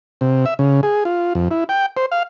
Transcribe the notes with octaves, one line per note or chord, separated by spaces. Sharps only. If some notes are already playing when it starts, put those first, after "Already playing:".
C3
E5
C#3
G#4
F4
F2
E4
G5
C5
F5